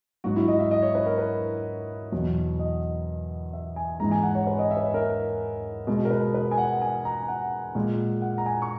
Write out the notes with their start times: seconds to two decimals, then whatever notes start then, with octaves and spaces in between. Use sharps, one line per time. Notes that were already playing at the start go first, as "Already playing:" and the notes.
0.24 G#2 F#3 F#4
0.36 E4
0.48 D#5
0.59 E5
0.71 D#5
0.82 C#5
0.95 B4
1.07 A#4
1.18 B4
2.12 E2 B2 F#3
2.59 D#5
3.53 E5
3.76 G#5
4.00 G#2 E3 G#3 A#5
4.11 G#5
4.23 F#5
4.35 C#5
4.47 B4
4.59 D#5
4.71 E5
4.77 B4
4.82 C#5
4.94 A#4
5.87 B2 G#3
6.05 A#4
6.10 B4
6.34 B4
6.51 G#5
6.58 F#5
6.81 G#5
7.05 A#5
7.28 F#5
7.75 A#2 G#3
8.22 F#5
8.38 A#5
8.46 G#5
8.62 C#6